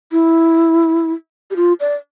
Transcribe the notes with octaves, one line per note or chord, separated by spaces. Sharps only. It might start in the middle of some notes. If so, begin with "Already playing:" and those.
E4
G4
F4
D5